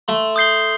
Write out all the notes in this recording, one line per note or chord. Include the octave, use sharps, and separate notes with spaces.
A3 C6
D#6 G6 C7 G7